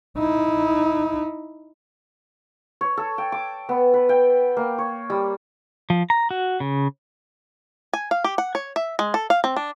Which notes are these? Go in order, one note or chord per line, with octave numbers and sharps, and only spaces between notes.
D#4 E4
C#5
A4
G5
D6
B3
B4
G5
A#3
C#5
G3
F3
A#5
F#4
C#3
G#5
F5
G4
F#5
C#5
E5
G#3
A4
F5
C4
D4